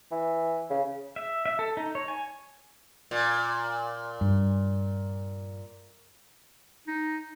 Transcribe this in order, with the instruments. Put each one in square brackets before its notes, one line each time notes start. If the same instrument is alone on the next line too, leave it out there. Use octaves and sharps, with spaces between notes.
[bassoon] E3
C#3
[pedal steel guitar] E5
E5
A4
D#4
C#5
G#5
[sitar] A#2
[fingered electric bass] G2
[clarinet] D#4